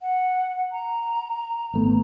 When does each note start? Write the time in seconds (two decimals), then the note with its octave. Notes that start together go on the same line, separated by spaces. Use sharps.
0.02 F#5
0.72 A#5
1.74 G#1 A3 B3